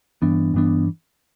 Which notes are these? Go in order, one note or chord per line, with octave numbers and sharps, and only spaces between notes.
G2 E3 B3 D4
G2 E3 B3 D4